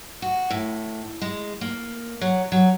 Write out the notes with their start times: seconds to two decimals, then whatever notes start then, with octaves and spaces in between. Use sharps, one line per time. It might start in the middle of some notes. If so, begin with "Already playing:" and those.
0.22 F#4
0.50 A2
1.22 G#3
1.61 A#3
2.21 F#3
2.52 F#3